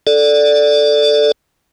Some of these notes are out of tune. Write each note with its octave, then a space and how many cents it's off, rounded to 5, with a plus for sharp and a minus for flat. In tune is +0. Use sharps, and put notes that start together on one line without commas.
A4 +0 D5 +0